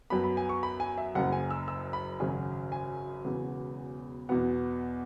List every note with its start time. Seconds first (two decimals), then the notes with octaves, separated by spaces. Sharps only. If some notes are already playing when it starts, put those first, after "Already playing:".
0.10 F#2 F#3 B3 B5
0.24 B5
0.37 G#5
0.49 C#6
0.63 B5
0.80 G#5
0.98 E5
1.15 F#1 F#2 C#3 F#5
1.32 G#5
1.51 E6
1.68 E6
1.93 B5
2.20 G#1 F#2 C#3 F#3 G#5
2.72 G#5
3.25 E1 E2 C#3 F#3 B3
4.29 E2 B2 F#3 B3 F#5